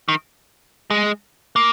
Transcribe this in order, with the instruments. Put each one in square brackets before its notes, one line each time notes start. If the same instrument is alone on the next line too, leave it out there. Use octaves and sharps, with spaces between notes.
[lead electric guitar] D#3
G#3
A#3